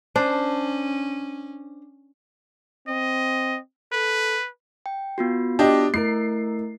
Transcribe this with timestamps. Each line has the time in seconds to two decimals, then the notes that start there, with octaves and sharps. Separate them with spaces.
0.16 C#4 D4 C5
2.88 C4 D#5
3.92 A4 B4
4.86 G5
5.18 B3 F4 F#4
5.59 D4 G4 D#5
5.94 A3 E4 A#4 C7